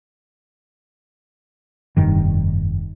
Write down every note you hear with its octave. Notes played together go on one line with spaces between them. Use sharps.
F1 G2 D#3